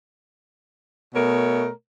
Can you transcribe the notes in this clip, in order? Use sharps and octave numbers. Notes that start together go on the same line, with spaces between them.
B2 A3 A#4 C#5